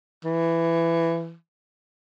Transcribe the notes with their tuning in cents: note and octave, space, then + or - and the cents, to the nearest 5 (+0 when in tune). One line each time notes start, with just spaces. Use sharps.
E3 +15